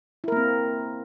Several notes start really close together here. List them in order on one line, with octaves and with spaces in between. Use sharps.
E4 A#4 A#3 C4